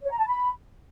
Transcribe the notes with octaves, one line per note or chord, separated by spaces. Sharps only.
C#5
A#5
A5
B5